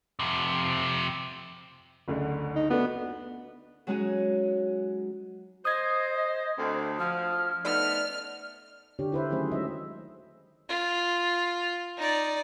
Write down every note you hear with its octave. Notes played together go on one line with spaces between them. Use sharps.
F2 C3
F#1 D2 D3
D#4
A3 B3 D4 F#4
F#3 G#3 C#4 D#4 F#4 G#4
C5 D#5 D#6 G#6
D2 C4
F3 F6
A3 B3 D#4 D5 F6
D3 D4 G4 C#5
E4 B4 C5 E5
D#3 F#3 A3 C#4 G#4 C5
G#3 D#5 E5
F4
D#4 D5